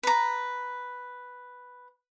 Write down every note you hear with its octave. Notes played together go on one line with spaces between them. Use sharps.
B4 A#5